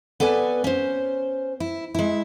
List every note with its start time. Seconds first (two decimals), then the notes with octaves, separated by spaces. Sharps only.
0.20 B3 A4 B4 D5 G#5
0.64 C#4 C5
1.60 E4
1.95 G#3 E4